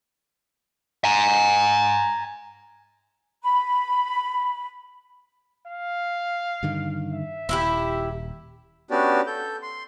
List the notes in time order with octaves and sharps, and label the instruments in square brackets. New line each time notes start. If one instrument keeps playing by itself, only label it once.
[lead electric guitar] G#5 A#5
[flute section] B5
[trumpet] F5
[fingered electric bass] G2 D3 D#3
[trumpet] E5
[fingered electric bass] D#1 [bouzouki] E4 F4 G4
[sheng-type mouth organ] B3 C#4 D4 F#4 G4 D5
A4 G6
C6